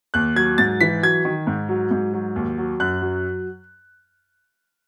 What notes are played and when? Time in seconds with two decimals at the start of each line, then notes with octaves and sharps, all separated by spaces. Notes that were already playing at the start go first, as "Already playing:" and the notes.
0.14 D#2 F#6
0.36 F#3 G#6
0.58 G#2 A6
0.81 E3 B6
1.03 F#3 G#6
1.25 D#3
1.47 G#2
1.69 F#3
1.91 G#2
2.13 F#3
2.36 D#2
2.58 F#3
2.80 F#2 F#6
3.02 F#3